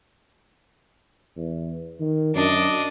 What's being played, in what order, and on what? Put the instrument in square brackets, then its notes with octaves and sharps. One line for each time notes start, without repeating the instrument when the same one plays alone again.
[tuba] E2
D#3
[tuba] F#2 [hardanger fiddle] D4 D#5